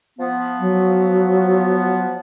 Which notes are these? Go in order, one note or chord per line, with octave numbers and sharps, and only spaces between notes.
F3 B3
F#3